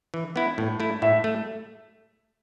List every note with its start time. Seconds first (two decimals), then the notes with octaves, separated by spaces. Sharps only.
0.14 E3
0.36 B3 E4
0.58 A2
0.80 A3 E4
1.02 A2 E5
1.24 A3